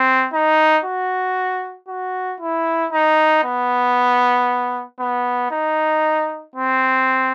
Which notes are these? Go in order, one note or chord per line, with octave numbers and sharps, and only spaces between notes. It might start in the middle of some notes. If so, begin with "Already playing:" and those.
Already playing: C4
D#4
F#4
F#4
E4
D#4
B3
B3
D#4
C4